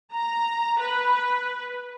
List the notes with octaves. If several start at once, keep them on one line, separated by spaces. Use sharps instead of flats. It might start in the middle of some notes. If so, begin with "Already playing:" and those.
A#5
B4